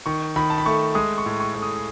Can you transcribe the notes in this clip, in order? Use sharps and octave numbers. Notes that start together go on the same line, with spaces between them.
D#3 C#6
D#3 B5
A5
B5
A3 C#6
G#3 D#6
C#6
A2
C#6
A2
D#6
D#6